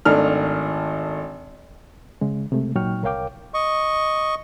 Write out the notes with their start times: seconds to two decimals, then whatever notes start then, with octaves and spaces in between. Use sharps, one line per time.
0.05 G#1 D#3 A3 D4 F6
2.21 C#3 G#3
2.52 C3 G#3 A3
2.75 A#2 F#3 D#4 G5 C#6 F6
3.03 C2 A#4 C#5 F5 G5 D6
3.54 D#5 C#6